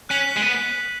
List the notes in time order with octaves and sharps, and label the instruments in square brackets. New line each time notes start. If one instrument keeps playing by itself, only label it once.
[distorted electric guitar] C#4 [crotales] F#6 B6 F#7
[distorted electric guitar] G#3
B3